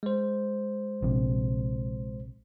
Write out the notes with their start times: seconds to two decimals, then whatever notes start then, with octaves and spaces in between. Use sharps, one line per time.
0.03 G#3 C5
1.02 A#1 C3